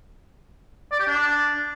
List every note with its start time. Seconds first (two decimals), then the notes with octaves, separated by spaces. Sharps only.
0.92 D5
1.00 G4
1.07 D4